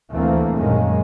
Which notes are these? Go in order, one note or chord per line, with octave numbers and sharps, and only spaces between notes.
D2 E3 A3 A#3 C4
A#1 F#2 D#3 G#3 A#3 C#4